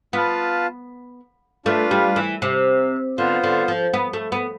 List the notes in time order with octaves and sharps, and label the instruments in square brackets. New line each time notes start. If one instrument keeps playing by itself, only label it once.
[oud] B3 [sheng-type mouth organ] F4 B4 F5 A5
[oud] A3 [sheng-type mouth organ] D4 F4 B4 F5
[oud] G3
E3
C3
[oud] D3 [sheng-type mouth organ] B3 F4 C5
[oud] D3
F3
B3
A3
B3